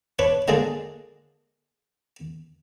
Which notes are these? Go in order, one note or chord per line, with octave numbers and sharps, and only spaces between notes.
D4 B4 C#5
D3 G#3 A#3 D4 G#4 D5